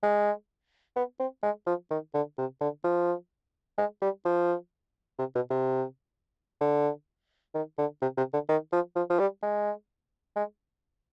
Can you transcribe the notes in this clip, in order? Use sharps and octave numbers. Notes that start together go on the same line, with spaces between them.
G#3
B3
C4
G#3
F3
D#3
D3
C3
D3
F3
G#3
G3
F3
C3
B2
C3
D3
D#3
D3
C3
C3
D3
D#3
F3
F3
F3
G3
G#3
G#3